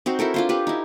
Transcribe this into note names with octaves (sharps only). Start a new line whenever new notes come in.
C4 D#4 F#4 C5
E4 F#4 A4 A#4
D4 F4 C5
F4 G4 B4
D#4 E4